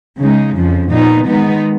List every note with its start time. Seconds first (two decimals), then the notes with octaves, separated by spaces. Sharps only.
0.19 C#3 G#3 D#4
0.54 F2 C#3 F3
0.90 A#2 F3 B3 D#4
1.26 D#3 G#3 B3 D#4